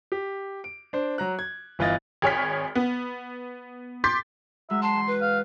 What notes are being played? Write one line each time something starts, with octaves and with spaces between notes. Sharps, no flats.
G4
D7
D4 C5
F#3 A#5 F#6
G#6
G1 E3 F4 D#5 A6
G#1 G#4 C#5 F6 B6
B3
C6 D6 G6 A6 B6
F#3 G#3 E5
A5 C6
E2
B4
F5